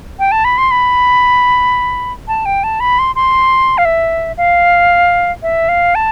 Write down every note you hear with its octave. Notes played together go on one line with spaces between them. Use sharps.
G5
A5
B5
C6
B5
A5
G5
A5
B5
C6
C6
F5
E5
F5
E5
F5
A5